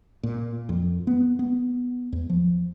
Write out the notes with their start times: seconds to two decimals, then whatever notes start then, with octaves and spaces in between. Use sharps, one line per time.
0.23 A#2
0.69 F2
1.07 B3
1.39 B3
2.12 E2
2.30 F3